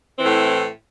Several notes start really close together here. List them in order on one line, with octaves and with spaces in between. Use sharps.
C4 E3 A2